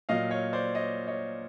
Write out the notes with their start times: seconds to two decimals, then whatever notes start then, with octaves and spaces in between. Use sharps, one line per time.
0.09 A#2 F#3 D#5 F5
0.31 C#5 D#5
0.53 C5 D5
0.75 C#5 D#5
1.07 C#5 D#5